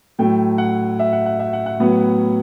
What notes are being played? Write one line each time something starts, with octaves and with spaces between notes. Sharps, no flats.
A2 F#3 A3 G5
F#5
E5
F#5
F#5
E5
F#5
F#5
A2 F#3 B3